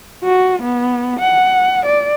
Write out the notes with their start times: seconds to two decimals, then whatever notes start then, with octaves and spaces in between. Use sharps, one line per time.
0.24 F#4
0.62 B3
1.20 F#5
1.86 D5